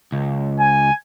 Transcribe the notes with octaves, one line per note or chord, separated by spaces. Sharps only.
C#2
G#5